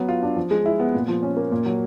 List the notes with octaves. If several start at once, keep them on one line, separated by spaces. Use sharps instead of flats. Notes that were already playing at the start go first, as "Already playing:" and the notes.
Already playing: F#3 B3
F4
D4
F3
G#3
E4
B3
A#2
F3
C#4
A#3
A#2
F#3